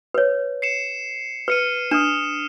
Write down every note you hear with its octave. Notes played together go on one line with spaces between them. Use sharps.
B4 C#5
C7 C#7 E7
B4 F6 C#7 D#7
D4 D#6 F6 E7